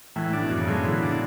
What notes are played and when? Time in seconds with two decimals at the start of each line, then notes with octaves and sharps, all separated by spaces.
0.16 A2 E3
0.33 D4
0.41 B2
0.51 F#2
0.58 C#3
0.67 D3 G#3
0.85 E3
0.94 D3
1.03 D4